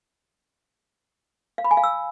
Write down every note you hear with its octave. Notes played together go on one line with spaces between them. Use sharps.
F5
B5
G#5
F5
E6